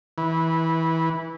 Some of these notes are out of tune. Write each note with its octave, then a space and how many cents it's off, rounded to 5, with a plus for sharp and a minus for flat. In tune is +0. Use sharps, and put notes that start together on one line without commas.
E3 -20